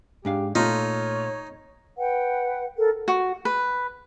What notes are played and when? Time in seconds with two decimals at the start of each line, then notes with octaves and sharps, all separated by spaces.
0.25 G#2 D4 G4 F5
0.55 A#2 A3 D#4 F4 C#5
1.98 B4 F#5 G5
2.78 A4 A#4
3.08 F#4
3.45 B4